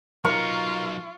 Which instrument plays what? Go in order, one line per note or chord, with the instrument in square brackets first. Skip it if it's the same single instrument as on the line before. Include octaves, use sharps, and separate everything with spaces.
[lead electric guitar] F#3 D#4 [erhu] F4 [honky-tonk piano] A#4 [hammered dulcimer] C#6